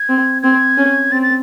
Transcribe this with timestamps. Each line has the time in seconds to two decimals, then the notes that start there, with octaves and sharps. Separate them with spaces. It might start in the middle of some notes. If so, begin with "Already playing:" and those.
Already playing: G#6
0.09 C4
0.42 C4 G#6
0.77 C#4
1.11 C4 A6
1.22 A6